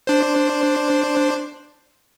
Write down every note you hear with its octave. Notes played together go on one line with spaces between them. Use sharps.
D4 C5